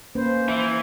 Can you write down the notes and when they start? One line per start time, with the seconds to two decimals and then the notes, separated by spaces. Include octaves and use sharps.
0.15 A#3 C#4 B4 C5
0.49 E3 E5